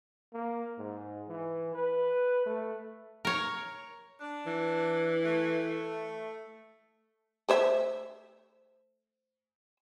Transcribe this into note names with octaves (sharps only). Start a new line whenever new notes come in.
A#3
G#2
E3
B4
A3
A#4 C#5
D4
E3
A3
A3 C5 E5